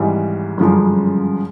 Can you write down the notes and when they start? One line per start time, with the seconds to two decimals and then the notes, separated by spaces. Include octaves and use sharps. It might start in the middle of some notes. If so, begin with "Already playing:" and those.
Already playing: G#1 G#2 E3 G3 G#4
0.57 G1 F#2 C#3 F3 G#3